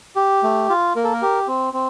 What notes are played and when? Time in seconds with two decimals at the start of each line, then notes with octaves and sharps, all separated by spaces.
0.16 G4
0.43 A3
0.69 F4
0.96 A#3 A#4
1.04 A4
1.13 A#4
1.22 G4
1.48 C4
1.73 C4